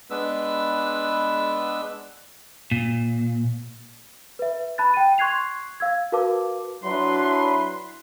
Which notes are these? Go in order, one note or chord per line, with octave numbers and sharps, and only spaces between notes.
G#3 B3 D4 B4 E6
A#2
B4 E5
A5 B5 F#6 A6
G5 D#7
C6 C#6 F#6 G#6 C7 F7
F5 E6 G#6
F#4 A#4 B4 F5 A5 D6
F#3 D4 E4 B4 C6